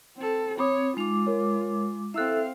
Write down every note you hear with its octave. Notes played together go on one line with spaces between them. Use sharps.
C4 A4
C4 C#5 B5 D6 D#6
G#3 D#4 F4 D6 F7
A#4 C#5
C4 E4 A4 E5 F5 E6 F#6